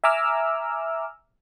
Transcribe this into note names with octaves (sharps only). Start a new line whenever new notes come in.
E5 G#5 A#5 D6 E6 F6